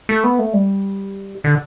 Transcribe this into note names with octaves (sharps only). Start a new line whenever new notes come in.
A3
B3
A3
G3
D3